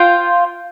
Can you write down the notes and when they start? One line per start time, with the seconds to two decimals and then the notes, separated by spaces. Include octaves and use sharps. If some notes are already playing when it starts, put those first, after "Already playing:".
Already playing: F4 C5 G5